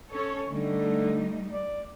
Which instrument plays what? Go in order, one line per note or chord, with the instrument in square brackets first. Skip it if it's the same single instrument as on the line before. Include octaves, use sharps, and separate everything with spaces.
[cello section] C#4 A4 C#5
[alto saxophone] D3 [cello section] G3 A3 D#4
[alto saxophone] D5